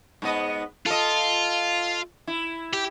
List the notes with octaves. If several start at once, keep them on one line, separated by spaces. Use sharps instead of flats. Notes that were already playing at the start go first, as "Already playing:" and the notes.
G#2 B3 D#5
F4 A4 D#5
E4
G4